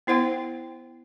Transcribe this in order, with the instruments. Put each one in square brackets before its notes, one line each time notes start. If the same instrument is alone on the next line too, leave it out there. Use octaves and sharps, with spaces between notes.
[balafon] B3 E4 C5 F#5 G5